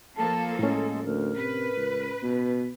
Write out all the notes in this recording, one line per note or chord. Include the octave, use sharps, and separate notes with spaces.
F3 A#3 A4 A5
A2 G#3 C#4
D2 A#4
C3 B4
C#2
B2